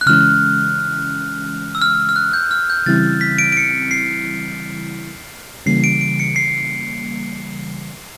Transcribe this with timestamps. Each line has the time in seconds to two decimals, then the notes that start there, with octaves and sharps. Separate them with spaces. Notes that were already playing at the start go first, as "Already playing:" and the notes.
0.01 F#6
0.06 C#3 E3 G#3 C#4 F6
1.75 E6
1.82 F6
2.09 F6
2.16 F#6
2.33 G6
2.51 F6
2.70 G6
2.86 C#3 E3 G3 C4 E4 A6
3.21 B6
3.39 D7
3.52 D7
3.57 C#7
3.91 C7
5.66 C#3 E3 G3 A#3 C7
5.84 D7
6.01 D7
6.20 C#7
6.36 C7